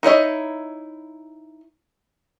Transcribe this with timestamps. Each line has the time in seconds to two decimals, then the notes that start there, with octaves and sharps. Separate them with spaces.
0.03 D#4 E4 C#5 D#5